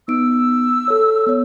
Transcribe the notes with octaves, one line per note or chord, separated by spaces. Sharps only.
B3 D#4 E6 D7
A4 C#5
B3 C#5